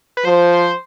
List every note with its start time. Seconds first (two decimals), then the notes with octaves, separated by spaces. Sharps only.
0.17 B4
0.25 F3 C5